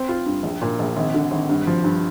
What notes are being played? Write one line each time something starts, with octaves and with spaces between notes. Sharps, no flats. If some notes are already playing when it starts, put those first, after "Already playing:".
Already playing: C4
F4
G2
A#1
A#2
A#1
G#1
D3
G#1
G2
F3
G2